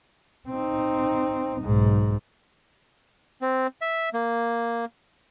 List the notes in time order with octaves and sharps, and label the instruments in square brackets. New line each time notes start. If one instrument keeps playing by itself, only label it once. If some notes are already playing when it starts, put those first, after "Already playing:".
[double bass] C4 D#4
B1 G#2
[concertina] C4
E5
A#3